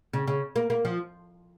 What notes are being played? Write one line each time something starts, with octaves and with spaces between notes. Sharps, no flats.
C#3
C#3
A#3
A#3
F3